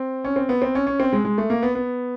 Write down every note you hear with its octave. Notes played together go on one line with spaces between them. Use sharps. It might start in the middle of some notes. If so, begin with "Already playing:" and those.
Already playing: C4
C#4
C4
B3
C4
C#4
C#4
C4
G#3
G#3
A3
A#3
B3
B3